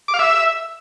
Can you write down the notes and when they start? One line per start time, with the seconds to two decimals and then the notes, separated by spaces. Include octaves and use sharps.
0.08 D6
0.14 F5
0.19 E5